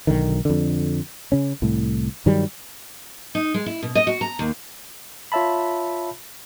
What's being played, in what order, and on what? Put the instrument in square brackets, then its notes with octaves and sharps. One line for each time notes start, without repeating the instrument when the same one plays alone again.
[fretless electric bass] B1 D3 D#3
F2 D3
C#3 C#4
C2 A2
G2 D#3 F#3 G3
[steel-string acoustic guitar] D#4
G#3
E4
B2
D#5
F#4
A#5
D#2
[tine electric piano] F4 C#5 E5 A5 B5